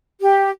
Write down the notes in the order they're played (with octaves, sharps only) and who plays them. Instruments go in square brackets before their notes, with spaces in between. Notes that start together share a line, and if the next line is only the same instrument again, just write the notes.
[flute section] G4